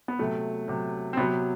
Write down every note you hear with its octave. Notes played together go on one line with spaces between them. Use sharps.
B3
C3 F#3 A3
C3 F#3
C4
C3 F#3 B3